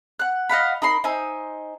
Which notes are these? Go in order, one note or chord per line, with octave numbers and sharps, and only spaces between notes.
F#5 F#6
D#5 F5 F#5 B5
D#4 A#4 B5 C6
D#4 C5 G#5 E6